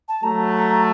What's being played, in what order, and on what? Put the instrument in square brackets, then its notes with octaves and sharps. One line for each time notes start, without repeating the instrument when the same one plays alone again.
[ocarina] A5
[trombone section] F#3 A3 [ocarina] A#5
[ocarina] A#5